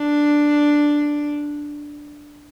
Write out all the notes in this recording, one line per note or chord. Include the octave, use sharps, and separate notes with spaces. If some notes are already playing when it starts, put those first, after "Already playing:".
Already playing: D4